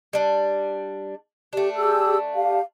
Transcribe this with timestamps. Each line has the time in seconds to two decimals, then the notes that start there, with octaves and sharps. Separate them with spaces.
0.13 G3 D4
1.53 A3 D4 G4
1.76 G4 G#4 E6
2.34 G4 F5